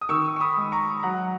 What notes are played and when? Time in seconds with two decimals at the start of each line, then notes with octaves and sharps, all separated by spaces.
0.01 D#6
0.09 D#3 C#6 E6
0.36 C#6
0.40 B5 D#6
0.57 G#3
0.72 A#5 C#6
1.03 F#3 F#5 A#5